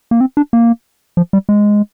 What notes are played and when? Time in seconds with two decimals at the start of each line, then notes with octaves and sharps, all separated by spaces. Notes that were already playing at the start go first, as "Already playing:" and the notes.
0.11 A#3
0.21 C4
0.37 D4
0.53 A#3
1.17 F3
1.33 G3
1.49 G#3